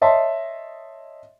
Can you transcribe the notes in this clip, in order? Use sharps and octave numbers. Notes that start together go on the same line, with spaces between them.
C#5 D#5 E5 A5 C6